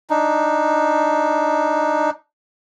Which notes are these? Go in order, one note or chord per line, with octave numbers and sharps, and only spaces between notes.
D4 D#4